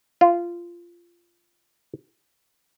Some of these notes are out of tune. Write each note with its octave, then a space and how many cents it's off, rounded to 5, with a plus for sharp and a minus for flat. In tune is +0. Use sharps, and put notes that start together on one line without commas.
F4 -15